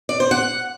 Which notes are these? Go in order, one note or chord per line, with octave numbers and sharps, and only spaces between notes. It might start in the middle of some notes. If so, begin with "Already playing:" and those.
D5
C5
F#5